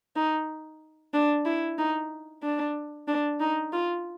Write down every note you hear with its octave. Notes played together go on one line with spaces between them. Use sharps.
D#4
D4
E4
D#4
D4
D4
D#4
F4